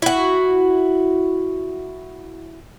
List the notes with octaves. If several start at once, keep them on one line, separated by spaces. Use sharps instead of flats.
E4 F#4